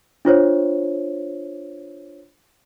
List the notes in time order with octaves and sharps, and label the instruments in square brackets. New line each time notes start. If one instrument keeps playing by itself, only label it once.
[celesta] D4 F4 C5 C#5